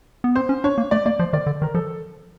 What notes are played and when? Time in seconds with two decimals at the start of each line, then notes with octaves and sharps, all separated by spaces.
0.24 B3
0.36 C4 C5
0.49 C#4
0.64 D4 C#5
0.78 A#3
0.91 A3 D5
1.06 A#3 D5
1.19 F3 C5
1.33 D#3 D5
1.47 D3
1.62 D#3 A#4
1.74 F3 A4